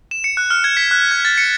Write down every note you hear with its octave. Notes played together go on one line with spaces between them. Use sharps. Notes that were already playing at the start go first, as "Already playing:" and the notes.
E7
C#7
F#6
F6
G#6
B6
F#6
G#6
A6
C#7